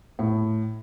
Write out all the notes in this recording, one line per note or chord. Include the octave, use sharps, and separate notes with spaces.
A2